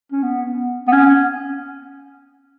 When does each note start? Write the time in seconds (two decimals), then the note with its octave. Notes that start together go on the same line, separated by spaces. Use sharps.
0.12 C#4
0.23 B3
0.88 B3
0.93 C#4